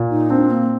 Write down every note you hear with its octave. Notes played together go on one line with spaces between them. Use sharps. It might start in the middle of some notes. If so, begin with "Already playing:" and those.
Already playing: A#2
D#4
C4 D4
A#3